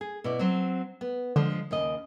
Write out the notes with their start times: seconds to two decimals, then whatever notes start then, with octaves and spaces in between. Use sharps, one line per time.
0.01 G#4
0.24 B2 E4 D5
0.39 F#3 C4
1.01 B3
1.36 D3 F3 G#3
1.71 D#2 C#3 D#5